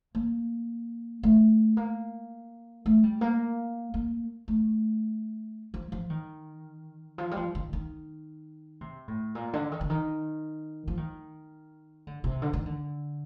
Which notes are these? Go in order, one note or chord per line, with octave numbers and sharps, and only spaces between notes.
A#3
A3
A#3
A3
G3
A#3
A#3
A3
F3
F3
D#3
F3
G3
F3
D#3
D#3
C3
A2
A#2
D3
D#3
D3
D#3
F3
D#3
D3
C3
D3
D#3
D3